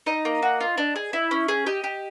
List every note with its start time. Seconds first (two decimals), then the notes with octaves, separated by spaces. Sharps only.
0.06 D#4 D#5
0.25 A#3
0.42 F#4
0.60 F4
0.78 D4
0.96 G#4
1.13 E4
1.31 C#4
1.48 G#4
1.66 G4 D#5
1.84 G4